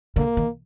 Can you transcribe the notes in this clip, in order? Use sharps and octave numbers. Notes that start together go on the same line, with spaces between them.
D3 A#3
D#3